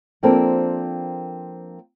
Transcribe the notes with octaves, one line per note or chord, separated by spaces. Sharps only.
F3 A#3 C4 D4 A4 A#4